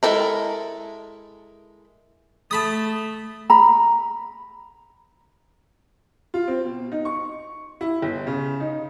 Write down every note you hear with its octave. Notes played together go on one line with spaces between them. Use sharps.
G#3 A3 E4 A4 A#4
A3 A5 B5 D#6
A#5 B5
F4
C4
B2
D#4
C#6
E4
G1
C#3
D#4